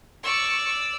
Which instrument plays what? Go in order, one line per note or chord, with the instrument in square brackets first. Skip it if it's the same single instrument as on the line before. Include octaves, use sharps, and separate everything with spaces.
[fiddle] D5 E6 [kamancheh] C#6